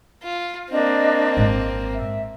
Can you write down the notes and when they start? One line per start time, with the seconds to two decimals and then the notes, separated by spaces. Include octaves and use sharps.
0.23 F4
0.70 A#3 C4 D4 D#5
1.37 G#1 G#2
1.95 E5